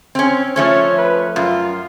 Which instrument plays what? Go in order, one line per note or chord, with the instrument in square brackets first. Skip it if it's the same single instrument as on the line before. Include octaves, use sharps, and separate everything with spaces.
[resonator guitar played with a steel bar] C4 C#4
[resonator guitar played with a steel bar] F3 A3 C#4 [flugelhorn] C#5
[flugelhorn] B4
[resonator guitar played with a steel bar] F#2 [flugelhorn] F4